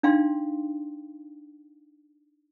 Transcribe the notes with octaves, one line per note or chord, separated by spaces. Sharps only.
D4 D#4 F5 G5 C6